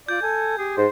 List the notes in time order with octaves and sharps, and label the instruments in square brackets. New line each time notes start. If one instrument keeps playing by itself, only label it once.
[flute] F4 [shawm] D5 [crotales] G6
[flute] A4 [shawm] G#5
[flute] G4 [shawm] G#4
[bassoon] G#2 [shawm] C5